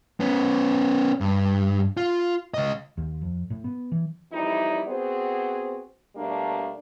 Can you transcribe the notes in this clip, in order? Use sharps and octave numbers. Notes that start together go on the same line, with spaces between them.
B3 C#4
G2
F4
C#2 D#5
D#2
F2
A2
B3
E3
F2 E3 G3 D#4 E4 D5
B3 C4 F#4 G#4 C5
B2 G3 A3 A#3 D4